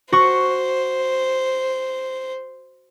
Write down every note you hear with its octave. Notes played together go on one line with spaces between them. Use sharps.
F#4 C5 C#6